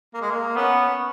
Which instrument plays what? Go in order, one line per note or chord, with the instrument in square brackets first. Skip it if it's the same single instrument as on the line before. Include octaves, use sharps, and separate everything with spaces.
[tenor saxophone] A#3
G#3
A#3
[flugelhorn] B3 [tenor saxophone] C#4